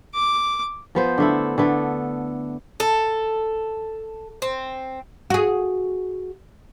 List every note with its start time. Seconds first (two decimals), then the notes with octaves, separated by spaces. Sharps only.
0.15 D6
0.95 F3 B3 C5
1.18 D3 A3 E4
1.58 D3 A3 B3
2.80 A4
4.42 C4
5.30 F#4 G#4